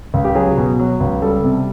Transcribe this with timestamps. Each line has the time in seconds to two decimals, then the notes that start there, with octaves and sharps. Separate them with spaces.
0.14 C#2
0.25 G4
0.35 F#3 G#4
0.57 B2
0.79 F#3
1.00 C#2
1.22 G3 A4
1.44 C3